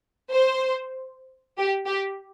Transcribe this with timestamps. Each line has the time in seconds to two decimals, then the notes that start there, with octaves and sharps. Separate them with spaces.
0.31 C5
1.58 G4
1.87 G4